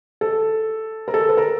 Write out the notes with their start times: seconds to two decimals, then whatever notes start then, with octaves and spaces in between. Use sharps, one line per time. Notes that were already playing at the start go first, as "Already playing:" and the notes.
0.21 A4
1.08 A#4
1.14 A4
1.29 B4
1.37 A#4